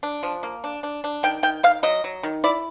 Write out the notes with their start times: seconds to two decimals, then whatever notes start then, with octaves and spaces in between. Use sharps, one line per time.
0.03 D4
0.23 F3
0.43 A#3
0.64 D4
0.83 D4
1.04 D4
1.23 D#3 G5
1.43 D#3 G5
1.63 D#3 F5
1.83 F#3 D#5
2.04 F#3
2.23 D#3
2.44 E4 D5